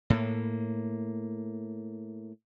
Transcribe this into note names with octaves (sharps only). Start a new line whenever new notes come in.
A2 A#3